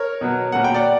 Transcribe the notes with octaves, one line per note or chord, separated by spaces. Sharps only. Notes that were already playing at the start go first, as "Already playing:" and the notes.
Already playing: A#4 C#5
B2 F#3 B3
A#2 F#3 A#3 F#5
G5
D5 F#5